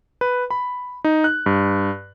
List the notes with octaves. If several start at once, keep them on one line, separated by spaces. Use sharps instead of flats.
B4
B5
D#4
F#6
G2